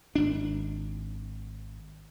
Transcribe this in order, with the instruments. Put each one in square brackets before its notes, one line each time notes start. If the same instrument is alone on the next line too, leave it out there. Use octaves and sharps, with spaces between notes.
[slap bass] G#1 D4